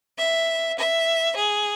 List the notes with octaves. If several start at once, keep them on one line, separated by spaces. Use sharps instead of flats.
E5
E5
G#4